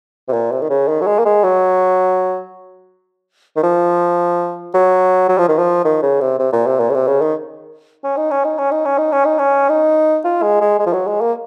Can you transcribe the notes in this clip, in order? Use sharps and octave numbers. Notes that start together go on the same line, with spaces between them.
C3
A#2
C3
D#3
C#3
D#3
F#3
G#3
A#3
G#3
F#3
D#3
F3
F#3
F#3
F3
D#3
F3
D#3
C#3
C3
C3
A#2
C3
A#2
C#3
C3
C#3
D#3
C#4
D#4
C#4
D#4
C#4
D#4
C#4
D#4
C#4
D#4
C#4
D#4
F4
G#3
G#3
G#3
F3
F#3
G#3
A#3